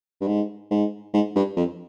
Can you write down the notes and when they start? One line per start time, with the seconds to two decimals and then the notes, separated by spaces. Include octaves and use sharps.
0.21 G2
0.27 G#2
0.71 G#2
1.14 G#2
1.35 G2
1.57 F2